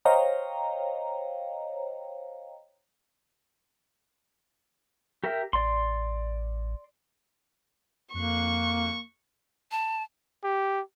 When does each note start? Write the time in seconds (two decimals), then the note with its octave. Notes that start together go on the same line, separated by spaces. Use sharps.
0.05 C5 C#5 D#5 F5 G5 A#5
5.24 G4 A#4 E5
5.53 A1 D5 C6
8.14 F2 A#3 C#6 F#6 C7
9.72 A5
10.44 G4